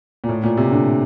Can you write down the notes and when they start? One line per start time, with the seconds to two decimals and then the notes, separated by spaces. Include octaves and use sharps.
0.24 A#2
0.29 A2
0.43 A#2
0.57 C3
0.71 D3